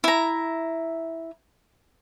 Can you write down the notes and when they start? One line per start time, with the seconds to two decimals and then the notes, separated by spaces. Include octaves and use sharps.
0.04 E4 A#5